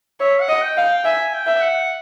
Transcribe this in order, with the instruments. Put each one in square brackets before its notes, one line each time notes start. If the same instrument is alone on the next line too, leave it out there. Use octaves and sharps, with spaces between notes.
[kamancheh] C#5 [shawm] E5
[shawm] F#5
[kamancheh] D#5
[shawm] G5
[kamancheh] F5
[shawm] G5
[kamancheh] E5 [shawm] G#5
[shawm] G5
[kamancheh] E5
[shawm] F#5